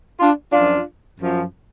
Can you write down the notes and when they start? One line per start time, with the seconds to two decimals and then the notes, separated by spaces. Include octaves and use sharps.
0.20 D4 F4
0.53 F#2 F3 D4 F4
1.19 F#2 F3